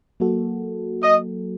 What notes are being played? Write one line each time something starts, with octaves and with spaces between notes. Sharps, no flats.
F#3 A#3 F#4 A4
D#5